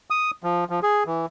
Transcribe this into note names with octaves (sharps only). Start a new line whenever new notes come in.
D#6
F3
F3
G#4
E3